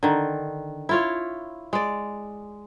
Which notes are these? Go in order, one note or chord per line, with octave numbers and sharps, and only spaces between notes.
D3 D#3
E4 F4 C#5
G#3 D5